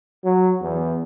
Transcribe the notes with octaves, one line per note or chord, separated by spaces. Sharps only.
F#3
E2